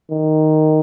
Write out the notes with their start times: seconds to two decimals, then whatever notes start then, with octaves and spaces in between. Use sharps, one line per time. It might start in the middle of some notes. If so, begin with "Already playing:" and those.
0.10 D#3